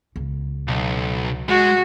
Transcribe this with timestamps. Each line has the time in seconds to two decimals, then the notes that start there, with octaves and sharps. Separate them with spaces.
0.16 C#2
0.68 B1
1.49 G#3 F#4